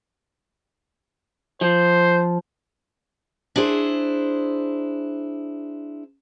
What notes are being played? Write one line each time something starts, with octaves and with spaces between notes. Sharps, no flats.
F3 C5
D4 E4 G#4 C5